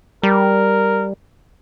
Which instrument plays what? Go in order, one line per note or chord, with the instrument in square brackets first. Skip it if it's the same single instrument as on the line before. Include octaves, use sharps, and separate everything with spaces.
[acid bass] G3 [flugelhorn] A#4